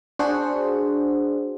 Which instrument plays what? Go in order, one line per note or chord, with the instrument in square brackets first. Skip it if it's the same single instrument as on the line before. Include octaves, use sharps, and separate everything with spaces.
[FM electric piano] D4 F#4 G#4 C5 F#5